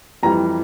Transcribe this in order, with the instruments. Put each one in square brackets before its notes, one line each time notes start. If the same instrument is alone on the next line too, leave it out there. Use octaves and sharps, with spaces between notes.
[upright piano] F2 E3 G3 A#5